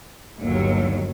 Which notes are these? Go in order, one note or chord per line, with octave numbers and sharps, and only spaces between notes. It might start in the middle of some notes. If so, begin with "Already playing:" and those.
G1 D#2 F#3